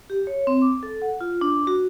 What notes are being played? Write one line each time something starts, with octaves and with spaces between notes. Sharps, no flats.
G4
C#5
C4
D6
A4
F#5
F4
D4
F#4